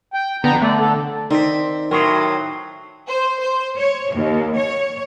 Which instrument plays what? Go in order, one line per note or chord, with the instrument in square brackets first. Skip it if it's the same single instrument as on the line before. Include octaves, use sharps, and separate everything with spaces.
[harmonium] G5
[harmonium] F2 G5 A#5 [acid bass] D3 [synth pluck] B3
[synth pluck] A3 [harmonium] D5
[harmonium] A4
[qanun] D#3 [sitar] C4 [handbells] D5 B6
[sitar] A2 F#3 [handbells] A#4 C6 D#6 [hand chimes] G5 C#6 C7
[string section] C5
C5
C#5
D#2
C#5